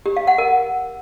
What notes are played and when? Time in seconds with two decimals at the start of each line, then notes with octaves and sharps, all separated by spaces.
0.06 G4
0.17 F5
0.27 F#5
0.38 A#4